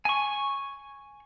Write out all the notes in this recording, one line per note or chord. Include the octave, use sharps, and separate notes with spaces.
G#5 C#6